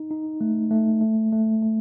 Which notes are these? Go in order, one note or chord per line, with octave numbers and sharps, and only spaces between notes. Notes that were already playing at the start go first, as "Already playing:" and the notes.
Already playing: D#4
D#4
A3
A3
A3
A3
A3